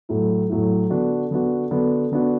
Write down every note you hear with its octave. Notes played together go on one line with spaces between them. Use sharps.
A2 F#3 A3 E4
A2 F#3 A3 E4
D3 B3 D4 F#4
D3 B3 D4 F#4
D3 B3 D4 F#4
D3 B3 D4 F#4